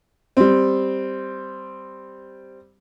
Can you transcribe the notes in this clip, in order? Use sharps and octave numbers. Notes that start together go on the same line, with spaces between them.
G3 C4